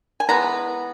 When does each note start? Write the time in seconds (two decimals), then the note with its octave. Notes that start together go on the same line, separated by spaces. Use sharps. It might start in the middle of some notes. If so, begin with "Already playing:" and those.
0.20 G#5
0.29 E3 G#3 B3 A#5